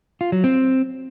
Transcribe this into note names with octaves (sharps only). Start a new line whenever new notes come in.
F4
F#3
C4